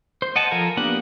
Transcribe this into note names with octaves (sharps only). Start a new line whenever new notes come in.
C5
D#5 F#5 G#5 A5
F3 A4 A#4 F5 G#5
A#3 B3 D4 G4 F#5